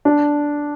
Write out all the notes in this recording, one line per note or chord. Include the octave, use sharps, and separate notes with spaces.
D4